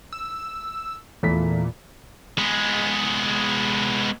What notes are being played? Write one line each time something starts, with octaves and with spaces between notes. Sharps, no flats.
E6
E2 A#2 A3 B6
G#3 B3